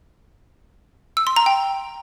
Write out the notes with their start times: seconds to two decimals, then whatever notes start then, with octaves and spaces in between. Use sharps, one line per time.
1.17 E6
1.27 C6
1.36 A#5
1.46 G5